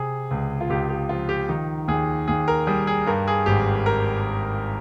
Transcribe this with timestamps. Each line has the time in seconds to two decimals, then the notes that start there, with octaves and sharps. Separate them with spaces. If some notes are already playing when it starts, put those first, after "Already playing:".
Already playing: C3 G#4
0.31 C#2
0.61 F4
0.69 C#2 G4
0.89 G4
1.09 F3 F4
1.29 G4
1.49 D#3 D#4
1.88 D#2 G#4
2.28 D#2 G#4
2.48 A#4
2.67 G3 G#4
2.87 G#4
3.07 G2 A#4
3.28 G#4
3.46 G#1 G4
3.86 A#4